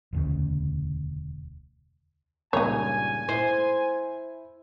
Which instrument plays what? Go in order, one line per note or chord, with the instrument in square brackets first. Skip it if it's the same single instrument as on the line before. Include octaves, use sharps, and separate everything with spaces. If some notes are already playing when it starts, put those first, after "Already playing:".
[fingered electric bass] E1 D2 C#3
[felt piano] C#2 G2 A#2 [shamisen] D#4 C#5 [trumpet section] G#5
[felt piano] E4 [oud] C5